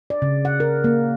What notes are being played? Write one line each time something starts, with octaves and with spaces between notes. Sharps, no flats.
D5
C#3
F#5
A#4
A#3